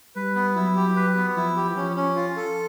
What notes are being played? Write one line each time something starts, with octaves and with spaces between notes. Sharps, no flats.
G3 B4
B3
F#3 E4
G4
B4
B3
F3 E4
G4
F3 C#4
C#4
F4
A4